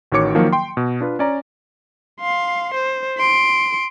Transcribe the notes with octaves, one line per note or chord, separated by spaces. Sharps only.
A1 D#3 F#4 C#5 D6 C#7
D#3 F3 F#3 A#3
G5 C6
B2
D4 F4 B4
C#4 D5 A#5
F5 C6
C5
C6 D7